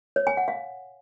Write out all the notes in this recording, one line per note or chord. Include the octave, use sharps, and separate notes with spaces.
C#5
G#5
F#5
F5